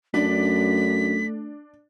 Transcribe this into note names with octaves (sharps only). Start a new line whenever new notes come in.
F#2 A3 D4 B6